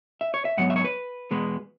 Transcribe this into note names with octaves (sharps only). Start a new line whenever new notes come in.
E5
C#5
E5
G#2 F#3 B3 F#5
E5
C#5
B4
E2 B2 G#3 B3